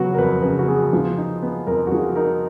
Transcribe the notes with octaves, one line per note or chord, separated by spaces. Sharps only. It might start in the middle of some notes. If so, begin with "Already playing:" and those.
Already playing: C#3 F#3 B3 F#4 B4
A#4
F2 B4
C#3 B4
F#4
B3 G#4
F3
D#4
B3
F2 A#4
F#4
F3 G#4
D#4 A#4